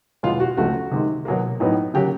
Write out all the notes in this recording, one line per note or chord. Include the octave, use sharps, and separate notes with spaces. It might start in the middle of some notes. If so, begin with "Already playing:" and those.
E2 B2 G#3 B3 F4
F#4
C#2 C#3 F3 A3 F#4
C3 D#3 G#3
B2 F#3 A#3
A2 F#3 B3 D#4
C#3 F#3 A#3 G4